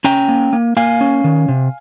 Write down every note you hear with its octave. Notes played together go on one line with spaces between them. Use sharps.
C#4 G5 A#5
A#3
A#3
A#3 F5 G#5
C#4
D#3
C3